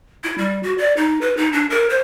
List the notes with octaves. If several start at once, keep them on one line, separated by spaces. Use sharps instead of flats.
E4
G3
F#4
D5
D#4
B4
D#4
D4
A#4
C5